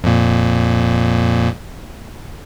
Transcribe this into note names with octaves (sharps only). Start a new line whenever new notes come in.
F2 A#2